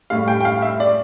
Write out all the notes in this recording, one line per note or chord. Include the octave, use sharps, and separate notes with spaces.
A2 G3 F5
G5
G5
F5
E5
D5